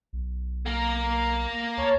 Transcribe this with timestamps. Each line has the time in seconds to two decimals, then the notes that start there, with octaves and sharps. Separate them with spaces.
0.13 B1
0.66 A#3 A#4
1.77 D2 C#5 A5